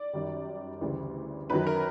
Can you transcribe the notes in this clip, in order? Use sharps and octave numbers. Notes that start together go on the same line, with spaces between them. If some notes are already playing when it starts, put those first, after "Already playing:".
Already playing: D5
F#2 D#3 G3
D2 C#3 E3 G3
F#2 D#3 F#3 B4
A#4